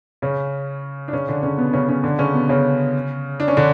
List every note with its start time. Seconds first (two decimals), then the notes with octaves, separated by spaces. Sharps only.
0.22 C#3 C#4
1.08 D4
1.13 C#3 C#4
1.28 D3 D4
1.43 C#3 C#4
1.58 B2 B3
1.73 C#3 C#4
1.89 C#3 C#4
2.04 D3 D4
2.18 C#3 C#4
2.34 B2 B3
2.49 C#3 C#4
3.40 D4
3.48 C#4
3.57 D3 D4